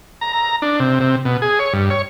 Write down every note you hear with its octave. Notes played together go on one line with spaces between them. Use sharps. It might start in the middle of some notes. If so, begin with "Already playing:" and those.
A#5
A#5
D4
C3
C3
B2
G#4
C#5
G2
C#5